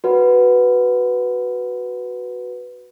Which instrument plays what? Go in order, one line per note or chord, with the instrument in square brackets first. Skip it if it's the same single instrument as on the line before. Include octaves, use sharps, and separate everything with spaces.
[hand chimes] F#4 B4